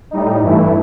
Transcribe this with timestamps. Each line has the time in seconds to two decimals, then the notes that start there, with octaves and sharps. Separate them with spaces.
0.11 A2 G3 D#4
0.42 G2 E3 A3 E4